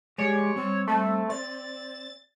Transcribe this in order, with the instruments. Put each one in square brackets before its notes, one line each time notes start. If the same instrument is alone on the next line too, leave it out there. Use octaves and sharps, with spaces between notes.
[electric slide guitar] G#3 D5 [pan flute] G4 [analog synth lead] C#5
[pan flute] G3 [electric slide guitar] C4
[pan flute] G3 [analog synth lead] A3
[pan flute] D5 [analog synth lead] A6